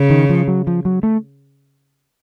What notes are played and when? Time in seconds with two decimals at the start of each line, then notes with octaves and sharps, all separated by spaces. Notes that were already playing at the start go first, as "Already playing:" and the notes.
Already playing: C#3
0.10 D#3
0.29 F3
0.48 F#3
0.67 F3
0.85 F#3
1.03 A3